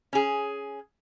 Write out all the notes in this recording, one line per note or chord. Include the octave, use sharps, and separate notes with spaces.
C#4 G#4